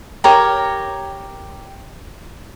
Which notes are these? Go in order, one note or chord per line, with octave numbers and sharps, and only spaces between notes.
G4 A#4 C#5 A#5